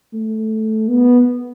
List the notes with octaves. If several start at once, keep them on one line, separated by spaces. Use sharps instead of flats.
A3
B3